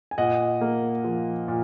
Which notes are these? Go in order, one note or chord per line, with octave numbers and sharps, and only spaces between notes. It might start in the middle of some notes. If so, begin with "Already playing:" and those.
G#5
A#2 D#5 F#5
A#3
F3
A#2